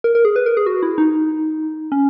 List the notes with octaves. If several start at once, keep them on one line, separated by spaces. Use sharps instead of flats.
A#4
A#4
G#4
B4
A#4
G#4
F#4
E4
D#4
C#4